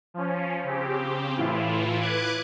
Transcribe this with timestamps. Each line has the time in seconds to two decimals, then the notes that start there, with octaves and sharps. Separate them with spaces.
0.14 F3 C#4
0.63 C#3 C4 G4
1.37 A2 E3 E4 F4
2.00 B4 D6 F#6 G#6